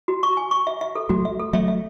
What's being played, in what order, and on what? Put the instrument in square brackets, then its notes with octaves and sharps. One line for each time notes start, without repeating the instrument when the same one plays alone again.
[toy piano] F#4
C#6
G#5
C#6
E5
E5
A4
[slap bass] F#3 A3 [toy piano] F#4
[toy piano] E5
A4
[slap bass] F#3 A3 [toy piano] E5
[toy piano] E5